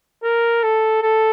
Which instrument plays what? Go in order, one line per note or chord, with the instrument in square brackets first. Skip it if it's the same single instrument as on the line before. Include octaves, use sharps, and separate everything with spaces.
[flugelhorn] A#4
A4
A4